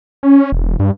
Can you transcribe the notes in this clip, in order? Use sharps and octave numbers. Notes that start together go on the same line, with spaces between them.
C#4
E1
G2